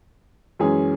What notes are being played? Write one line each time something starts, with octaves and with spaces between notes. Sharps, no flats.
F#2 E3 G#3 C#4 G#4